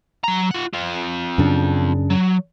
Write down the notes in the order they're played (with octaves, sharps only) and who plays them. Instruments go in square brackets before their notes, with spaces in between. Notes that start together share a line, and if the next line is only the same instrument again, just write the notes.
[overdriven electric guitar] F#3 A#5
F4 F#5
C4 F4
[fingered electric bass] F#2 C#3 D4
[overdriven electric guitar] F#3